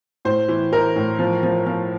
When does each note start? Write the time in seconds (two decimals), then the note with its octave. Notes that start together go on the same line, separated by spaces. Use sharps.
0.25 A2 C5
0.48 E3
0.72 E3 A#4
0.96 A2
1.19 F3
1.43 F3
1.67 F3